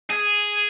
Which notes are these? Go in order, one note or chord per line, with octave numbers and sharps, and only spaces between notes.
G#4